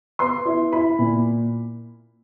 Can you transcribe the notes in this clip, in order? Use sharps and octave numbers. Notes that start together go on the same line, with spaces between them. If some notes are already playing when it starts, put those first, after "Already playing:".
B3 C6
E4
E4 B5
A#2